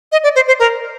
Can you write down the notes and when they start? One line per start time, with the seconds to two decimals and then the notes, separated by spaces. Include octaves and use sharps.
0.12 D#5
0.24 D5
0.36 C5
0.48 C5
0.59 A#4